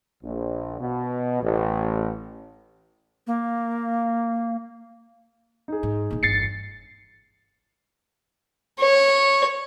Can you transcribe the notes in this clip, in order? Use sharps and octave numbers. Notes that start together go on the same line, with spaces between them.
A#1
B2
A1
A#3
D#4 G#4
G#2
A#1 D#3
G1 E2 A6 C7 C#7
C#5